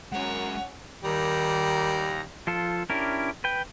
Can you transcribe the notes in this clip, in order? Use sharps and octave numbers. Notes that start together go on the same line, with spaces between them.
F#2 G#3 C#4 A#4 C#5 F#5
D#2 D#3 G3 A#5
F3 F4 A4
C#4 D4 E4 G4 A#4
B4 G5